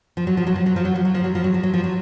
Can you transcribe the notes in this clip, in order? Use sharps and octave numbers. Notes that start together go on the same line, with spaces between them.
F3
F#3
F3
F#3
F3
F#3
F3
F#3
F3
F#3
F3
F#3
F3
F#3
F3
F#3
F3
F#3